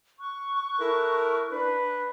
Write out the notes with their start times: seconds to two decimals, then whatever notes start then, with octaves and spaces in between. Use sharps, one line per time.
0.19 C#6 F#6
0.80 E4 A4 A#4
1.52 D4 B4